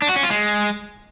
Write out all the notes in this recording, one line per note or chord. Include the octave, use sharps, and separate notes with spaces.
D4
F#4
C#4
F4
G#3